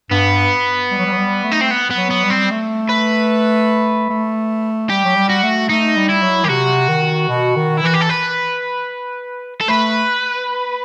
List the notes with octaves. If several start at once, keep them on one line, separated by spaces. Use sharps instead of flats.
G2 B3
G3
F#3
G3
F#3
G3
A3
D#4
C4
B3
B3
F#3
B3
G3
C4
A3
B4
A3
G3 G4
F#3
G3
F#4
A3
A3 D#4
G3
E4
F#3
D#3 G4
C3 F#4
D#3
B2
D#3
E4
E3 F#4
G4
A4
B4
A4
A3 B4